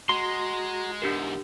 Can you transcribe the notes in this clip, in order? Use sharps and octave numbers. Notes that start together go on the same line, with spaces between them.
G#3 F#4 A#5 C6
E2 G#2 D4 G4 A#4